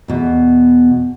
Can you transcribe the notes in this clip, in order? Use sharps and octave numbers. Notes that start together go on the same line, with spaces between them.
E2 B2